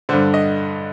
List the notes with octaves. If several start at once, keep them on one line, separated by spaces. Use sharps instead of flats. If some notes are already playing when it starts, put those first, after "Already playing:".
G2 D3 C5
D#5